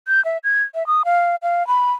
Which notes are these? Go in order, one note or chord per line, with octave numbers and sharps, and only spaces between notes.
G6
E5
G#6
E5
D#6
F5
F5
B5